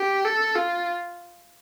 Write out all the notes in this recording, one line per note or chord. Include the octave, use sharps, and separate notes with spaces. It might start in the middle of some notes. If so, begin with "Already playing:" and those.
Already playing: G4
A4
F4